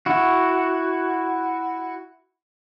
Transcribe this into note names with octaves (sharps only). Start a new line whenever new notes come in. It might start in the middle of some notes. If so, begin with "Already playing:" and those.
E4 F#4